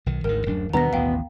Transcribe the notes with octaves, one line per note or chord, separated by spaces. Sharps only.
B1 D#3
G#1 D2 D#3 A#4
D1 F#2 D4
D#2 B2 D#3 B3 D4 A#5 A#6
A1 D#2 F5 G5